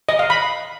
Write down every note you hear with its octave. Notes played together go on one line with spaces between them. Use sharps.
D#5
F5
B5